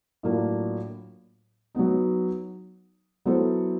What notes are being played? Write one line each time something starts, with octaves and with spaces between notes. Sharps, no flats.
A2 F#3 A#3 D4 F4
F#3 B3 D#4
F#3 B3 E4 A4 C5